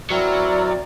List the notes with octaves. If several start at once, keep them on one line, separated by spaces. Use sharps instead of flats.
F#3 C4 E4 A#4 D5